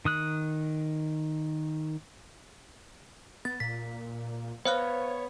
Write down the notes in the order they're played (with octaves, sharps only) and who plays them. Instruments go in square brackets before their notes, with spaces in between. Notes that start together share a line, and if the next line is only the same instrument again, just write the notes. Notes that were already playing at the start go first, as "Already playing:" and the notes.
[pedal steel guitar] D#3 D#6 F#6
[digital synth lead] B3 [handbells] A6
[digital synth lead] A#2 [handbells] B6
[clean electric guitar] B3 [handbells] C5 F5 F#6 [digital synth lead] C#5